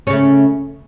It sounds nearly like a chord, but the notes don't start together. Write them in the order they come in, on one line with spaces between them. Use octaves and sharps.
C#4 C#3 A3